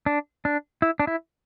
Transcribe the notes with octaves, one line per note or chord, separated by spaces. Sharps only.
D4
D4
E4
D4
E4